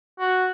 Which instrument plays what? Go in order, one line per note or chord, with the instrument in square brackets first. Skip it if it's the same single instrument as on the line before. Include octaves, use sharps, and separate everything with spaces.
[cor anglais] F#4